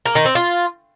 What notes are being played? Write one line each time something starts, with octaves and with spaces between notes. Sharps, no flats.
A#3
D#3
C4
F4